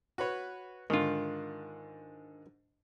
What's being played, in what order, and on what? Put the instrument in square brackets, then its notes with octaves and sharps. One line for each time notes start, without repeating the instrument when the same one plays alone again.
[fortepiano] F#4 B4 C#5
[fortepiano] G#2 D3 [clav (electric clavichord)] D#3 F4